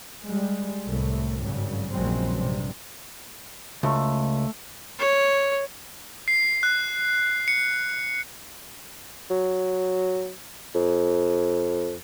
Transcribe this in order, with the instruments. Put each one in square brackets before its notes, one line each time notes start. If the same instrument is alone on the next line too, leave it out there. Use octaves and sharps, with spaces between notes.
[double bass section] G3 G#3
C2 A2 A3
G#1 G2 C#3 F#3 G3
A#1 E2 C#3 F#3 G#3 C4
G2 C3
[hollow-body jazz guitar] C#2 [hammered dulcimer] A3
[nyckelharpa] C#5
[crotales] C7
F#6
C#7
[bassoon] F#3
F2